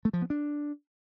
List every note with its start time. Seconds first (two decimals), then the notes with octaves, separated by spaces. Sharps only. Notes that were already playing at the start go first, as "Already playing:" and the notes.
0.05 A3
0.13 F3
0.22 B3
0.30 D4